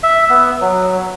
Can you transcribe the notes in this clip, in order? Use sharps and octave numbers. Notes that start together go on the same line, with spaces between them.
E5
B3
F#3